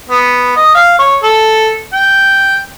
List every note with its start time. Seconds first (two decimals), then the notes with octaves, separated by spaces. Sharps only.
0.09 B3
0.56 D#5
0.75 F5
0.99 C#5
1.23 A4
1.93 G5